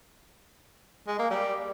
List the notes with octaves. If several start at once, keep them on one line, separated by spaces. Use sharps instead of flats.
G#3
A#3
G3